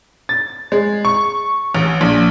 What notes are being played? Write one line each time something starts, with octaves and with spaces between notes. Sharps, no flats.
A6
G#3
C#6
A1
A#1